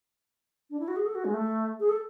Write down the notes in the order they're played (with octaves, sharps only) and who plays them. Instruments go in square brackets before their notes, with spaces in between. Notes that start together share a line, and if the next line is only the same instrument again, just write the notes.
[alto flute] D4
E4
F#4
G#4
A4
F#4
G#3
A3
G#4
A4